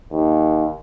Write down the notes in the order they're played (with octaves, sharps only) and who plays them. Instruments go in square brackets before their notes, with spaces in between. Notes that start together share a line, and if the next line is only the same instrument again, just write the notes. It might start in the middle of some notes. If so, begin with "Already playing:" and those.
[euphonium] D#2